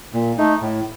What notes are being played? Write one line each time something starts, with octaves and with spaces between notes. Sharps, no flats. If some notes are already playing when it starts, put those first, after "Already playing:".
A#2
A3 D#4
A2